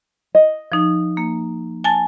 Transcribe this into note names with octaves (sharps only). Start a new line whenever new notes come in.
D#5
F3 D#4
A#3
G#5 A5 A6